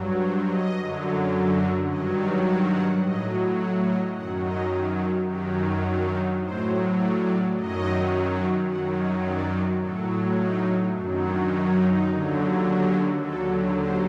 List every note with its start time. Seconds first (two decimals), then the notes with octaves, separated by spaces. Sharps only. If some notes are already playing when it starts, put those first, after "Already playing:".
Already playing: G2 F#3
0.19 C5
0.48 D#5
0.76 F#2 D3 F#3
1.89 G2 D#3 F#3 D#5
2.17 D5
2.46 F#5
2.74 F#5
3.02 A2 F#3 D#5
3.58 F#5
3.87 D#5
4.15 F#2 D#3 F#3 F#5
4.43 D#5
5.28 F#2 D#3 F#3 G4
5.85 D4
6.13 D#4
6.41 A2 F#3 C5
6.98 D5
7.27 D5
7.54 F#2 D#3 F#3 D#5
8.67 F#2 D#3 F#3 F#5
8.96 D#5
9.24 D5
9.80 A2 F#3 A4
10.38 D#4
10.94 F#2 D#3 F#3 D4
11.22 D4
11.51 D#4
11.79 D#4
12.06 D#2 D3 F#3
12.64 F#4
13.20 D#2 D3 F#3 A4
13.77 C5